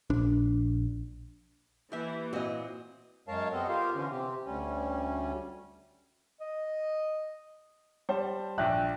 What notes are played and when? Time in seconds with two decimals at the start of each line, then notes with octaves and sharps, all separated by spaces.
0.10 A#1 D4
1.92 E3 A#3 G4 E5
2.33 A#2 C4 F#4 D#5
3.28 F#2 G#3 A#4 C#5 F5 A5
3.52 G3 B3 C4 A4 D#5
3.68 F4 G4 A#4 C5 F5
3.95 D3 E3 C#4
4.11 C3 C4 G4
4.46 D2 G3 C#4
6.41 D#5
8.09 G3 C5 A5
8.58 A#1 D5 E5 G5 F#6